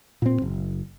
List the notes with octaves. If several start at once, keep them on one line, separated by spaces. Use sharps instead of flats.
A#2 C4
F#1